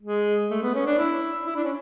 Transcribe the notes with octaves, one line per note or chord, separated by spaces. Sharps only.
G#3
A3
B3
C#4
D4
E4
E4
D4
C#4